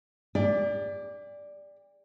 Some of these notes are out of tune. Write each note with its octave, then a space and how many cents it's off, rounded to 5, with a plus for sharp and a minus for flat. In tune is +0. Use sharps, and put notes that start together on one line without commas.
G4 +40 D5 -5